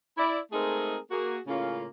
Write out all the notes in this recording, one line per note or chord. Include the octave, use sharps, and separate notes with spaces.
E4 D5
G#3 A3 C4 D#4 G#4 A#4
A#3 F#4 G#4
A2 C#3 A#3 C#4 F4